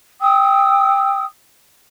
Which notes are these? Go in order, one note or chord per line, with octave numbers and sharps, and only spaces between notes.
G5 D#6 E6